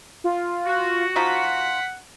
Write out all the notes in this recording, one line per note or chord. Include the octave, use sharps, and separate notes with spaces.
F4
F#4
F3 D#4 F4 F#5 B6